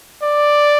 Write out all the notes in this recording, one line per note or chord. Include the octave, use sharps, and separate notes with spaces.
D5